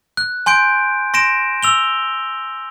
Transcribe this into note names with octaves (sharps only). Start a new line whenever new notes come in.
F#6
G#5 C6 G6 D7
C6 A#6 D7 E7
E6 F7 G7